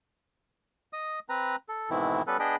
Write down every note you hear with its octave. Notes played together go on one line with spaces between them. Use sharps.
D#5 D#6
C4 B4 A#5
A4
G#2 B2 D#3 E3 C4 E4
G3 B3 C#4 A4 B4
B3 D4 G#4 D#5 G5 B5